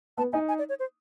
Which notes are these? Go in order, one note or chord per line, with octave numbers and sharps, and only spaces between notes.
B3 A5
D#4 G#5
G#5
D5
C#5
C5